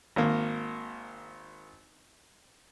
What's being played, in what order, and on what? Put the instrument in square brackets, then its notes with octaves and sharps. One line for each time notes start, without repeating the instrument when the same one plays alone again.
[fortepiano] G#1 A#3